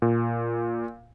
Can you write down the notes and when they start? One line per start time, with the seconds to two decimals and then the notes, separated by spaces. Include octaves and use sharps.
0.02 A#2